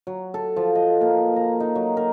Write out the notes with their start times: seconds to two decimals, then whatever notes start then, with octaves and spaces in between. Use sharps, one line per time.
0.07 F#3
0.34 A4
0.56 F3
0.75 D#5
1.01 A#3
1.36 A#5
1.60 D#4
1.75 F#3
1.97 A#4